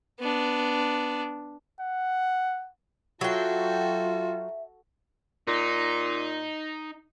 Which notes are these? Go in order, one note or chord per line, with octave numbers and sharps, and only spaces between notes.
B3 D4
F#5
F#3 F4 F#4 A4 E5 G5
A#2 D#4